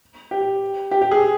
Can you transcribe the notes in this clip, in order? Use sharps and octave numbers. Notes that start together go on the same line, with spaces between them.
G4
G4
G4
G#4